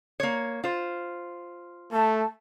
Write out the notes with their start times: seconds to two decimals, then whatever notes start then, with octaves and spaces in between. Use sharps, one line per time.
0.20 A#3 C#5
0.64 F4 C5
1.92 A3 A5